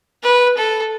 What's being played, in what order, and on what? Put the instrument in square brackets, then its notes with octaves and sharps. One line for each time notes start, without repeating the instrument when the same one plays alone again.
[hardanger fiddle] B4
A4